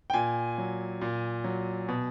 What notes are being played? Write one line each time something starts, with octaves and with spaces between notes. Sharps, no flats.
G5
A#2 G#5
F#3
A#2
F#3
B2